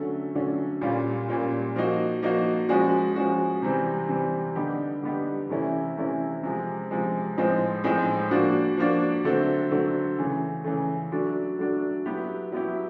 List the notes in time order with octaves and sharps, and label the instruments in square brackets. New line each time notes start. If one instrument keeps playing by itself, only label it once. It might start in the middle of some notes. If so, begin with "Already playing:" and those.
Already playing: [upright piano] D3 F#3 A3 C#4
D3 F#3 A3 C#4
A#2 G3 A#3 C#4 F4
A#2 G3 A#3 C#4 F4
F3 A#3 D#4 F#4
F3 A#3 D#4 F#4
F3 G#3 C#4 F#4
F3 G#3 C#4 F#4
C3 E3 G3 C4
C3 E3 G3 C4
D3 G3 B3 D#4 G4
D3 G3 B3 D#4 G4
C3 E3 A3 C#4 E4
C3 E3 A3 C#4 E4
C3 F3 G#3
C3 F3 G#3
A2 F3 G#3 C4 D#4
A2 F3 G#3 C4 D#4
F3 A#3 D4 F#4
F3 A#3 D4 F#4
D3 F#3 A3 C4
D3 F#3 A3 C4
C#3 E3 A3
C#3 E3 A3
F#3 A3 D4 F#4
F#3 A3 D4 F#4
F#3 B3 E4 G4
F#3 B3 E4 G4